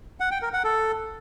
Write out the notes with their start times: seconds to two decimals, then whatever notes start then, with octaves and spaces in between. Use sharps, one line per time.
0.20 F#5
0.31 G5
0.42 A#4
0.53 F#5
0.64 A4